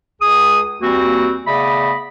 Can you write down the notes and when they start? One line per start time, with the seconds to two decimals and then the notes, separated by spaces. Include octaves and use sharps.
0.21 C#2 G#4 D#6
0.81 D#2 E3 G3 A#3 C4 F#4
1.47 C#3 A3 B3 D5 D#5 B5